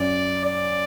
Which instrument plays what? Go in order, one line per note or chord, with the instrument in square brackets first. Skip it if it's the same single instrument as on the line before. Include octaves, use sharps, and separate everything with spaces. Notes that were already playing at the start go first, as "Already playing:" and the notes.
Already playing: [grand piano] F#2 [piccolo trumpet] D5
[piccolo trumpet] D5